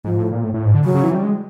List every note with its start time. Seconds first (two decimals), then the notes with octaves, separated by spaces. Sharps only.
0.05 G#2 F3
0.17 A2
0.32 A#2
0.44 A2
0.54 A2
0.65 G#2
0.74 D3
0.84 C#3 F#3
0.94 C#3
1.04 E3
1.15 G3
1.24 G#3